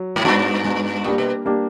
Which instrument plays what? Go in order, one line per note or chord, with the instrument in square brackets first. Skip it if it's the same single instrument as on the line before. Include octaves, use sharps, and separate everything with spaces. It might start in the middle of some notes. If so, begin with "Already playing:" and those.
Already playing: [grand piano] F#3
[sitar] G#2
[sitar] G2 [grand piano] G#3 B3 D4 F#4
[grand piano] G#3 B3 D4 F#4
[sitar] A#2 [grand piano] G3 A#3 D4 G4
[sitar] B2
[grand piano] G3 A#3 D4 G4